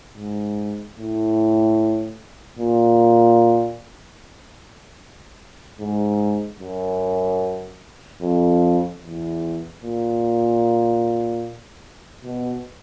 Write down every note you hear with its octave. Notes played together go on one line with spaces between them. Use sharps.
G#2
A2
A#2
G#2
F#2
F2
E2
A#2
B2